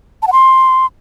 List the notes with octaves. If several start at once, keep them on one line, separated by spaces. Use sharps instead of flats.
A5
F#5
C6